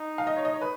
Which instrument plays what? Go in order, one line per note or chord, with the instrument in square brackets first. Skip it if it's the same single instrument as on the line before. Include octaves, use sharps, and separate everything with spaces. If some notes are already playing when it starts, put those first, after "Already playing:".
Already playing: [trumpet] D#4
[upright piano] F5
D#5
C#5
D#5
C#5
B4